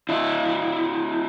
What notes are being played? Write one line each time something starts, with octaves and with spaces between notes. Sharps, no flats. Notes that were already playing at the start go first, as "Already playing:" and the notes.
D4 E4